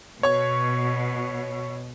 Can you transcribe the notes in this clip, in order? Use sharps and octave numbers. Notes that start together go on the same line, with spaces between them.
B2 C#5 C#6